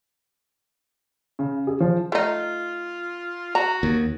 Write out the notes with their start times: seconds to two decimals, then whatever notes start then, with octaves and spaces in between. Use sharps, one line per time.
1.39 C#3
1.67 G#4
1.80 F3
2.12 A3 D#4 F4
3.55 F#4 A#5
3.83 D#2